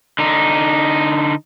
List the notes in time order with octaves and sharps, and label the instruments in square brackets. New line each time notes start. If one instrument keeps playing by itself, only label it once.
[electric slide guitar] D3 D#4